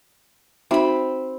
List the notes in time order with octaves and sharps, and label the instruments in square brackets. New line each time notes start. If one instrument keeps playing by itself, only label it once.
[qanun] C4 B5 [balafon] D#4 F#4 E5